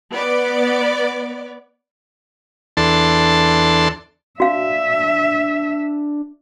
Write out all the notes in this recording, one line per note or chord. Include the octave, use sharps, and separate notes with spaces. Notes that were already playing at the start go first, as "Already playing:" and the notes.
B3 D5
E2 D4 A4 A5 C6
D4 F#4 E5 F5